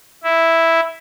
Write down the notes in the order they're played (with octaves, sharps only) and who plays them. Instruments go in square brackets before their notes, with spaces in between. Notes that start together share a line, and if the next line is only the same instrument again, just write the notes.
[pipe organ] E4